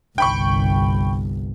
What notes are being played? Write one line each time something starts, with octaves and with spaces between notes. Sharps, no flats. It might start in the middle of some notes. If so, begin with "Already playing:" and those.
G1 C2 G5 B5 C#6